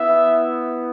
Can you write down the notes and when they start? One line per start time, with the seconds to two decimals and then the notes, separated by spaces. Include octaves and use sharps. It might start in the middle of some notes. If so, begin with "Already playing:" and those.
Already playing: B3 E4 E5